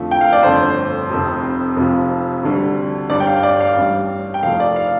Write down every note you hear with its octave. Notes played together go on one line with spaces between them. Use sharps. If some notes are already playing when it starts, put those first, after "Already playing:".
Already playing: F2 D3 F3 A3
G5
F5
D5
G1 F2 D3 A3 C5
F1 F2 C3
F1 F2 C3 F3
D2 D3 G3
G1 G2 G3 D5
G5
F5
D5
F5
A1 G2 G3
G5
F1 F2 F3 A3 F5
D5
F5